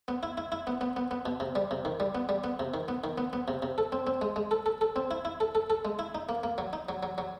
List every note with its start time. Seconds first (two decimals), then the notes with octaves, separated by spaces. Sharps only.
0.08 B3
0.23 E4
0.38 E4
0.52 E4
0.67 B3
0.81 B3
0.96 B3
1.11 B3
1.26 B2
1.40 C3
1.55 G3
1.71 C3
1.85 D#3
2.00 G3
2.15 B3
2.29 G3
2.44 B3
2.59 C3
2.74 D#3
2.88 B3
3.04 D#3
3.18 B3
3.33 B3
3.48 C3
3.62 C3
3.78 A4
3.92 C4
4.07 C4
4.22 G#3
4.36 G#3
4.51 A4
4.66 A4
4.81 A4
4.96 C4
5.11 E4
5.25 E4
5.40 A4
5.55 A4
5.70 A4
5.85 G#3
5.99 E4
6.15 D#4
6.29 A#3
6.43 A#3
6.58 F#3
6.73 D#4
6.89 F#3
7.03 F#3
7.18 F#3